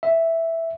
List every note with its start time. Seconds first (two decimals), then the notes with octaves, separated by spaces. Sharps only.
0.03 E5